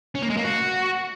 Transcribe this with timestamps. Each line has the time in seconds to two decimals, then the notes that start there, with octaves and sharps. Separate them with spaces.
0.15 C#4
0.22 A#3
0.30 G#3
0.37 A#3
0.44 F#4